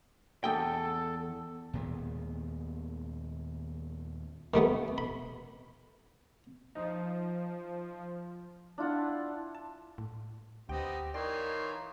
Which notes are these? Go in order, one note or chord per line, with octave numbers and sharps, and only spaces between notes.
E2 A4 G5
D#2 A#2 G#3 B3
D#3 G3 A3 B3
B5
F3 D#4
D4 E4 F4 F#5
A5
A2
D2 B3 C4 D#4 G4 G5
E3 D#4 F4 A#4 C#5 D5 G5 C6